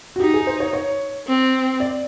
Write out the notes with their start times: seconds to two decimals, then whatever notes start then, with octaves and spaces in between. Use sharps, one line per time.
0.16 F#4
0.20 D#4 G4
0.34 G#4
0.47 C5
0.60 C#5
0.73 C#5
1.28 C4
1.80 D5